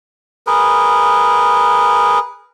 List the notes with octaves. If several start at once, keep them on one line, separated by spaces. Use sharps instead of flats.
G#4 A#4 B4